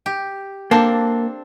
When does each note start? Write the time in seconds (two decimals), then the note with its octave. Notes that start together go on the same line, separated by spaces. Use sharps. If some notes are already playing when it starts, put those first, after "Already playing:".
0.06 G4
0.71 A#3 C4 D4 A4